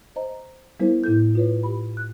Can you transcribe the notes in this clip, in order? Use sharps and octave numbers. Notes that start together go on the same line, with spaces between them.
C5 D#5 A#5
G3 B3 E4 A#4 C5
A2 E4 A4 G6
F4 B4 C#5
G4 B5
F#6